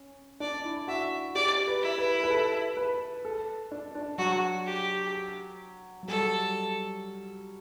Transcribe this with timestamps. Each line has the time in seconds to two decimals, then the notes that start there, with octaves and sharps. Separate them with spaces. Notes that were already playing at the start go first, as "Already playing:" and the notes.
Already playing: C#4
0.40 D4 D5
0.65 E4
0.88 F#4 E5
1.35 G4 D5
1.67 B4
1.82 E4
1.98 B4
2.24 B4
2.30 A4
2.77 B4
3.25 A4
3.72 D4
3.95 D4
4.18 F#3 F#4
4.66 G4
6.03 F#3
6.08 G3 A4